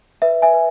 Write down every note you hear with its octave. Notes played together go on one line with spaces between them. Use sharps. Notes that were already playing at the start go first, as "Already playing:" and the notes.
B4 E5
E5 G#5
B4